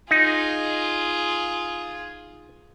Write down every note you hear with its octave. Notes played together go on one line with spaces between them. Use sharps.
D#4 F4 G#4